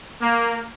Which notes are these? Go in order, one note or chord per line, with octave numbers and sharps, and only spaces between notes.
A#3